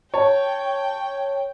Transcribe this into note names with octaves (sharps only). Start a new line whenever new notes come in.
C#5 G5 A5